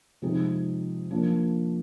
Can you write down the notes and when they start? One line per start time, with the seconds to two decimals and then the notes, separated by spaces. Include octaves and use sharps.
0.22 C3 F3 G#3 C4 D#4
1.11 F3 A#3 D4